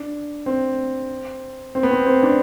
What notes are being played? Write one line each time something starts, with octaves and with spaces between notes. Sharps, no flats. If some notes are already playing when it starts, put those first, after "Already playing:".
Already playing: D4
C4
C4
B3
C4
C4
D4